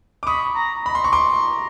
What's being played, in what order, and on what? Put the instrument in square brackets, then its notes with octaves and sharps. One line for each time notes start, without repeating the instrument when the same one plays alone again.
[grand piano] D6
[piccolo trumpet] B5 [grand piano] C#6 D#6
[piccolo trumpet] A#5
[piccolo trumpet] A#5 [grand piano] B5
[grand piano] C6
C#6
[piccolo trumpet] A#5 [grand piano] C6 D6